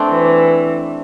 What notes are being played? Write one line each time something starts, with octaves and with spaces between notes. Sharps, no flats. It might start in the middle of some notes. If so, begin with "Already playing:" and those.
Already playing: A3 C4 D4
E3